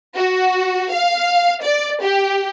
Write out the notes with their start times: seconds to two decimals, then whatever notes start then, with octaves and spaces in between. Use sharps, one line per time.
0.16 F#4
0.92 F5
1.63 D5
2.02 G4